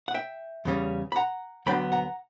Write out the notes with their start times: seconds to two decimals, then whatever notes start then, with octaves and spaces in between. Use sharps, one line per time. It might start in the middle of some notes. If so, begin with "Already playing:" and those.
0.08 F#5
0.14 E5 G5
0.65 E2 C#3 G3 C#4
1.12 B5
1.16 F#5 A#5
1.66 D2 D3 F#3 B3 D4 G5 B5
1.92 F#5 A#5